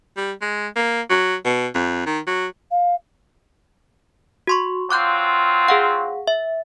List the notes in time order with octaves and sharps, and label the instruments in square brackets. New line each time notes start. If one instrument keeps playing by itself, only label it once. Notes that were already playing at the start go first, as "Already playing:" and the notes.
[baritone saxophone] G3
G#3
A#3
F#3
B2
F2
D#3
F#3
[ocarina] F5
[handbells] F#4 C6 C#6
[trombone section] F#3 C4 F4 [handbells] D6 F#6 G6
[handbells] G#4 F5 F#5
E5